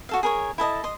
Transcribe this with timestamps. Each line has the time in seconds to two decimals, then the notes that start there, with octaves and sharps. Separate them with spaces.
0.09 F#4 A4 F5
0.23 G#4 A#4 C#5
0.58 E4 A4 D#5 A5
0.84 D#5 C6